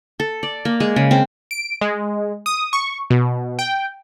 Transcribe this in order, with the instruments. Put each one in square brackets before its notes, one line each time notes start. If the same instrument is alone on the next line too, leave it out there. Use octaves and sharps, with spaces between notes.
[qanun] A4
D5
A#3
G#3
C#3
C4
[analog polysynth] D7
G#3
D#6
C#6
B2
G5